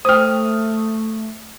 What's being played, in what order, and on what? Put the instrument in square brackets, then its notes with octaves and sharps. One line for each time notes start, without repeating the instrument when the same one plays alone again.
[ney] A3 [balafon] C5 G5 [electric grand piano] D#6 F6